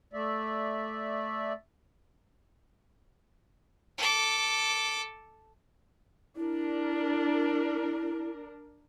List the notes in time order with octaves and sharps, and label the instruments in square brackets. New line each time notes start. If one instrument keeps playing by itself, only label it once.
[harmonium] A3 D5 E5
[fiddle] A4 D6
[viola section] D4 A#4 [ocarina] E4